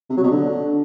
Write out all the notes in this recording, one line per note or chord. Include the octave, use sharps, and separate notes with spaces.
C3
F#3
B2
D3